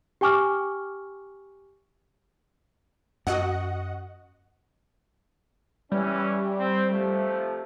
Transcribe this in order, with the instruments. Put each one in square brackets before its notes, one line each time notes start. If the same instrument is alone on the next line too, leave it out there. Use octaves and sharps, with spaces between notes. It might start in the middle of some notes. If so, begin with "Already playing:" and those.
[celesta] G4 G5 G#5 C#6 D6 F6
[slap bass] F#2 [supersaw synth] F#4 D#5 F#5
[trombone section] E3 C#4 [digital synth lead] G3
[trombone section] C4
C3 F3 A3